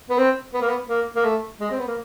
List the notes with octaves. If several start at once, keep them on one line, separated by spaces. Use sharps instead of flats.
B3
C4
B3
A#3
B3
A#3
A#3
A3
G#3
C4
B3
A#3